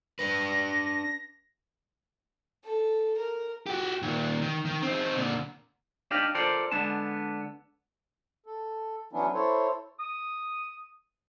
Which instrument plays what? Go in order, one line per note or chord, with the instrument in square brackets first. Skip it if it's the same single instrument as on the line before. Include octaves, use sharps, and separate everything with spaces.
[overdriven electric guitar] D4 B4 [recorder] A#6
[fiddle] A4
A#4
[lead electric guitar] F#4 G4
A#2 D#3
D#3
D#3
C4 D#4
A#2 D3
[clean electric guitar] D4 D#4 G4 D5 D#5 F5
F4 A4 A#4 C5 D5
D3 G#3 B3 D4 A5
[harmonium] A4
E3 F#3 B3 C#4 D4 E4
E4 A4 C5 C#5
[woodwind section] D#6